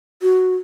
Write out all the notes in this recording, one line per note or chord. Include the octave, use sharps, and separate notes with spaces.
F#4